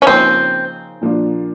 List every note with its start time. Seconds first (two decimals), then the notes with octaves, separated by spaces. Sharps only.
0.02 C#4
0.07 C#3 F3 A#3 C4 D#4
1.01 A#2 F3 A#3 D4 F4